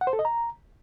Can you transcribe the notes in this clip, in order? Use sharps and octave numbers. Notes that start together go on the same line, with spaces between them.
F#5
C5
A4
D#5
A#5